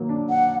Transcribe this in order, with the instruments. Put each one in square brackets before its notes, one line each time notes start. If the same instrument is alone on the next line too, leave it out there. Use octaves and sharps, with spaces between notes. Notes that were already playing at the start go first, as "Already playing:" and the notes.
Already playing: [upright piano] D#3 F#3 A#3
D4
[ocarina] F#5